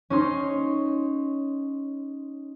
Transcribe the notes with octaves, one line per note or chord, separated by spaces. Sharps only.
C#4 D#4 C6